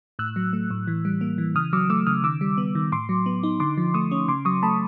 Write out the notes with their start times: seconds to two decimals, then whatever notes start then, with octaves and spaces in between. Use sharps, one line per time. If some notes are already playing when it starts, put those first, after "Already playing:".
0.19 A2 E6 F#6
0.36 F#3
0.53 A3
0.70 A2
0.87 E3
1.05 G3
1.21 A#3
1.38 E3
1.55 C#3 D#6 F6
1.73 F#3 D6 E6
1.90 A3 D6 E6
2.07 C#3 D#6 F6
2.24 D#3 D6 E6
2.41 G3
2.58 B3
2.75 D#3
2.92 A2 C6 D6
3.09 F#3
3.26 B3
3.43 D#4
3.60 D3 C6 D6
3.77 F3
3.94 A3 C#6 D#6
4.11 C#4
4.28 C#3 C6 D6
4.45 F#3 C#6 D#6
4.63 A3 A5 B5